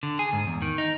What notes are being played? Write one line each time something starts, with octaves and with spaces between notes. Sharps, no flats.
D3
G#4
G#2
E2
D#3
D#4